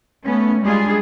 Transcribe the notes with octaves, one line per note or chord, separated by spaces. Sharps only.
A3 B3 C#4
G3 G#3 D4 F4 G#4